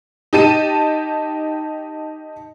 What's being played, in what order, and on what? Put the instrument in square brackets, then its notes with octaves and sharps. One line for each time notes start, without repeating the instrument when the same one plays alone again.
[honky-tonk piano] D#4 G4 A5 D#7